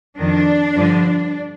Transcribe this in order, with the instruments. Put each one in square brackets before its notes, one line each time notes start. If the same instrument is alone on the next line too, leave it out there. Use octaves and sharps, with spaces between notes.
[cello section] F2 D#3 D4
G2 D3 F3